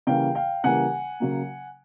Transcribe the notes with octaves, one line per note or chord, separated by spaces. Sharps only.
C#3 E3 G3 A#3 F5 G5
F5 G5
C#3 E3 G3 A#3 F#5 G#5
C#3 F#3 A#3